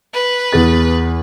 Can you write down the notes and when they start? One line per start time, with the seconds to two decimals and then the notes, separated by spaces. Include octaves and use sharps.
0.13 B4
0.52 E2 G#4 A6